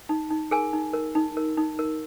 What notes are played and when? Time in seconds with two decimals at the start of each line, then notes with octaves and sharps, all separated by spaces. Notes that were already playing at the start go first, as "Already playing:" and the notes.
0.09 D#4
0.30 D#4
0.51 G#4 A#4 G#5
0.73 D#4
0.93 A#4
1.15 D#4
1.37 A#4
1.57 D#4
1.79 A#4